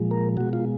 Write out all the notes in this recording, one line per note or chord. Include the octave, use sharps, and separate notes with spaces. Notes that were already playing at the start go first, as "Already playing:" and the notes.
Already playing: A#2 F3 G#3
A#4
B2 G#3 F#4
F4